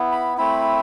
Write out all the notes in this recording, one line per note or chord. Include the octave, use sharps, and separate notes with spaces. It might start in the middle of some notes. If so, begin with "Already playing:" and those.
Already playing: B3 E4
B5
A3 C4 E4 B5